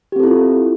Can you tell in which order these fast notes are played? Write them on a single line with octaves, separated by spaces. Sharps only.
G4 C4 A4 E4 F4